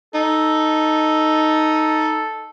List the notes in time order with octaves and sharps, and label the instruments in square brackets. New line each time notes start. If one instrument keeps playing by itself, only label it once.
[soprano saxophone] D#4 [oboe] A4